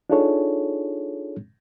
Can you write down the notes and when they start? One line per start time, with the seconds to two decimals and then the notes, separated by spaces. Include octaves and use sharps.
0.10 D4 D#4 F4 G#4 A4 C#5